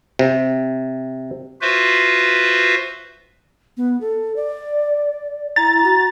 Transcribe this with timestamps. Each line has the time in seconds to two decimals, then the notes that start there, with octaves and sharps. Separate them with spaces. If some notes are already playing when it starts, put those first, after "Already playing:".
0.19 C3
1.61 F4 F#4 B4 C5 E5
3.77 B3
4.01 A4
4.36 D5
5.56 E4 A#5 A6
5.84 F#4